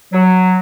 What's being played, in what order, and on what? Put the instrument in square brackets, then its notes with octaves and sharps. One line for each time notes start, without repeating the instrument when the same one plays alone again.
[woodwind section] F#3